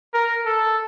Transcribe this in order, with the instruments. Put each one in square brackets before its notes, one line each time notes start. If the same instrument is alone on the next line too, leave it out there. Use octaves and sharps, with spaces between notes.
[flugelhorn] A#4
A4